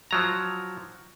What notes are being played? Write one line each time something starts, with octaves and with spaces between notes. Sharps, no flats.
F3 F#3 A#5